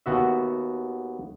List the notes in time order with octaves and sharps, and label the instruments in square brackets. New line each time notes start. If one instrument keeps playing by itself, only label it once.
[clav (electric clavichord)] D#2 B3 F#4 E5